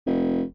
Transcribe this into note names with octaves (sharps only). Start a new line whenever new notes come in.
F1